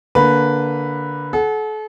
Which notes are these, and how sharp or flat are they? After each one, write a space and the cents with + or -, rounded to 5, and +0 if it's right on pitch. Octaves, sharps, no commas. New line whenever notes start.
D3 -10 A#3 +0 B4 +0
A4 -40 F#5 +0